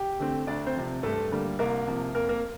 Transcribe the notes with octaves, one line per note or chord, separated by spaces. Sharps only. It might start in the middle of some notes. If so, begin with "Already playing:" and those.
Already playing: G4 G5
D3 A3 C4
D2 D4 D5
C4 C5
C3 F3
G2 A3 A4
D3 G3 A#3
C2 A#3 A#4
C3 F3 A#3
F2 A#3 A#4
A#3 A#4